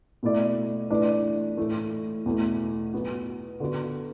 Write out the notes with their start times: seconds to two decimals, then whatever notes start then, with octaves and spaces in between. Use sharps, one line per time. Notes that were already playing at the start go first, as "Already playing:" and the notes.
0.23 B2 A3 E4 D5
0.90 E3 A3 D4 B4 D5
1.57 A2 E3 A3
2.26 E2 B2 A3
2.93 F#3 B3 F#4
3.60 D3 B3 F#4